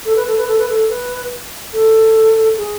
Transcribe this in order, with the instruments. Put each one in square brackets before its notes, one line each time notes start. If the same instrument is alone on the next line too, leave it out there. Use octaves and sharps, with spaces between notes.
[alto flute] A4
B4
A4
B4
A4
B4
A4
B4
A4
G#4